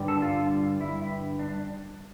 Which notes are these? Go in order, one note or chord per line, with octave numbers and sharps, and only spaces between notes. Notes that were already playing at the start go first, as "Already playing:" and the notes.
Already playing: G2 D3 G3
A4
F4
E4
D4